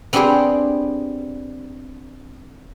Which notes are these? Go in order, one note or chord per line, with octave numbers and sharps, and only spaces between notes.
B3 C4 D4 G4 G#4 C5